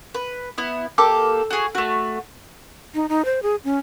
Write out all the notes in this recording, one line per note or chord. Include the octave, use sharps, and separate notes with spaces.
B4
B3 E4
A#3 G4 A4 D6
F#4 G#4
A3 F#4
D#4
D#4
C5
G#4
C#4